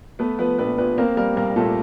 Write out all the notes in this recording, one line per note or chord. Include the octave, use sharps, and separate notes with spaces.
A3 B3 B4
F3 B3 B4
A#1 B3 B4
A#2 B3 B4
A#3 C4 A#4
G3 A#3 A#4
C2 A#3 A#4
A#2 A3 A4